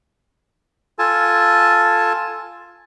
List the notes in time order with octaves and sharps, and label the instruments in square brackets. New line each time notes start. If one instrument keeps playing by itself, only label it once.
[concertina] F4 A4 G#5 A5